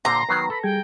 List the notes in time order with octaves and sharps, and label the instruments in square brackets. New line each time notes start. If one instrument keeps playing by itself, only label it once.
[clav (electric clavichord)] A#2 D3 C5 [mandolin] A#5 [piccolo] C6
[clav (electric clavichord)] D#3 F#3 B3 [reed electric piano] B4 [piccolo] C7
[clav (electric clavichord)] A4 [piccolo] B5
[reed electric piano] G3 G#4 G#6 [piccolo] G5